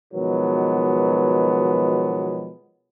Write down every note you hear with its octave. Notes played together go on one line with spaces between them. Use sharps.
B2 D#3 F3 F#3 G#3 B3